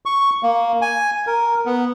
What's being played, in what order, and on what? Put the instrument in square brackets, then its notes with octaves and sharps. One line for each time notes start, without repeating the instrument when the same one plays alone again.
[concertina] C#6
A#3
G#5
A#4
B3